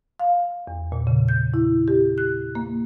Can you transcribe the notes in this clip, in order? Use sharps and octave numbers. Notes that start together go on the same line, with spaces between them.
F5
E2
A#2
C#3
G6
E4
G4
F#6
A#3